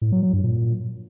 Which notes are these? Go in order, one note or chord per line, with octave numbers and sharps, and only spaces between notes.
A2
F#3
F#3
G2
A#2